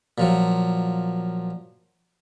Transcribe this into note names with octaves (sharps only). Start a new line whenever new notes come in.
A#2 F3 F#3